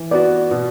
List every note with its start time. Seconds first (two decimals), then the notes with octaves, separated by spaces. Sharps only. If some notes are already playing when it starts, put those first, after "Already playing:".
Already playing: E3
0.11 B3 F#4 D5
0.51 B2